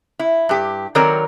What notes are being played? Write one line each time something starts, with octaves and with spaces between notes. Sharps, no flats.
E4
G2 G4
D#3 F#3 C4 A#4 C#5 D5